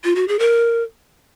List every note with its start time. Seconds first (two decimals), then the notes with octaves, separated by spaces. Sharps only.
0.04 F4
0.15 F#4
0.28 G#4
0.39 A#4